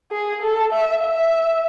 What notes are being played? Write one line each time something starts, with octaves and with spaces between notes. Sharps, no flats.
G#4
A4
E5
E5